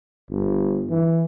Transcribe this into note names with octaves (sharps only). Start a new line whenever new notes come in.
G1
E3